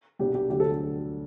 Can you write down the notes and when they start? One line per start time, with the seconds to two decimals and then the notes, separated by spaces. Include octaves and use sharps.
0.19 C2 B2 G3 D4 G4
0.35 G4
0.50 D2 D3 F#3 G4
0.60 A4